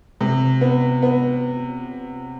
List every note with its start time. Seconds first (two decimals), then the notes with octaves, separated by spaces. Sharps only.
0.21 C3
0.61 B3
1.02 B3